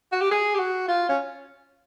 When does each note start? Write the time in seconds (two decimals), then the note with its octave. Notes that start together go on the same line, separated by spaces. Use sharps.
0.12 F#4
0.21 G4
0.31 G#4
0.54 G4
0.59 F#4
0.88 F4
1.09 C#4